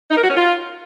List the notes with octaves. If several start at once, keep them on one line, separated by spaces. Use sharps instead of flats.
D#4
A#4
F#4
C#4
F4